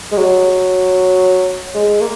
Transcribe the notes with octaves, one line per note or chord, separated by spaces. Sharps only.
G#3
F#3
G#3
A#3